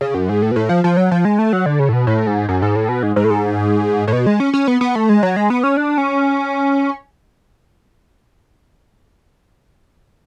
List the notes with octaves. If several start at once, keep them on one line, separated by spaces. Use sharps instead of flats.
C#3
F#2
G#2
A2
B2
A2
F3
F3
F#3
F3
G#3
A3
F#3
D3
C#3
A2
B2
A2
G#2
F#2
G#2
A2
B2
G#2
G#2
A2
G#2
A2
B2
G#3
C#4
C#4
B3
B3
A3
G#3
F#3
G#3
B3
C#4
D4
C#4